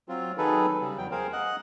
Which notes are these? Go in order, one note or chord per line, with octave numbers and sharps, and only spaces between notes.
F#3 C4 F4
D#3 F#3 D#4 G#4 A4 B4
C#3 G3
E2 F#3 G5
G#4 A#4 C5 F5
D#5 F#5 F#6